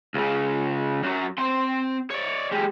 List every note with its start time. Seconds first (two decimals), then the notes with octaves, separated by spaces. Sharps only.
0.14 C#2 C#3
1.03 F#2 F#3
1.38 C4 C6
2.10 C#5 D5
2.51 G#3 G4